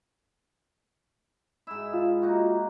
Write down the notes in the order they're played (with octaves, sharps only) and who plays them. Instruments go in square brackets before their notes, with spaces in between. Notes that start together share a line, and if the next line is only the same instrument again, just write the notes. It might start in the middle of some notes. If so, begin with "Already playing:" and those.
[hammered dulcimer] G#2 E4 [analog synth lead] E6
[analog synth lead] F4
[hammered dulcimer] A#3 D#4 F#4